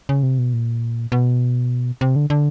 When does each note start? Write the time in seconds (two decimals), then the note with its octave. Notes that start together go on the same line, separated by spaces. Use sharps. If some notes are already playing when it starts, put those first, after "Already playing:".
0.09 C#3
0.23 C3
0.38 B2
0.53 A#2
1.12 B2
2.01 C3
2.16 D3
2.30 D3